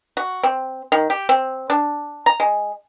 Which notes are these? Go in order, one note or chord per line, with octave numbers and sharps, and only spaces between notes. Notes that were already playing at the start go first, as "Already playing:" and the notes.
F#4
C4
D#3
G4
C4
D4
A#5
G#3